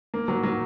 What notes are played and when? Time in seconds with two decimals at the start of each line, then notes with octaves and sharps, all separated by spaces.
0.14 A#3
0.28 F#3
0.43 F#3